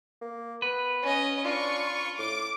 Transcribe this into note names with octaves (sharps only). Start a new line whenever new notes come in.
A#3
B3 B4
C#4 D#5
D4 F4 C#6
A2 D6